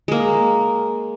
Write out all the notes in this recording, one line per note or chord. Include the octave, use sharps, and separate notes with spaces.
G#3 A#3